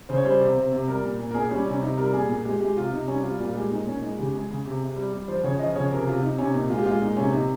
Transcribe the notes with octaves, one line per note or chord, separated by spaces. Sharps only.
C#3 C5
C#5
G3 C5
C3
C3
C3
G3 A#4
A#2
A#2
A#4
A#2 G#4
G3 C#4
C3 C#4
C3 D#4
G3 A#4
A#2 G#4
A#2
G#3 G4
G#3 G4
C3 F4
C3 D#4
G3 C#4
G3 F4
A#2 F4
G#3 G4
A#2 D#4
A#2 C#4
G#3 D#4
C#3 G4
G#3 G#4
C#3
C3
C3
G3
G3
F3 C5
C#3 C#5
F3 D#5
C#3 C#5
C3 A#4
C3 F4
C3 D#4
C3 C#4
A#2 D#4
G#3 F4
G4
G#3 F4
A#2 D#4
C3 C#4
C3 D#4